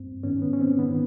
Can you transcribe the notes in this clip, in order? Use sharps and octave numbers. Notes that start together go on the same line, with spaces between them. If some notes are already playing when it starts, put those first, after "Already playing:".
Already playing: G2 C4
G#2 D#3 B3 C#4
B3
C#4
C4
G#2 D#3 B3